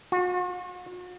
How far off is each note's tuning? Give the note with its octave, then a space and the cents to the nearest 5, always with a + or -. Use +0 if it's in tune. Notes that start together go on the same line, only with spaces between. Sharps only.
F#4 -45